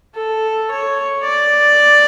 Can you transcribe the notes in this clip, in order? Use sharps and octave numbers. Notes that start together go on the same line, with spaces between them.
A4
C#5
D5